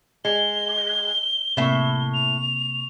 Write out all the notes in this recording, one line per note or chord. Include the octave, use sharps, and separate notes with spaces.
G#3 G7
A2 C3 A#3 E5 C#6
F7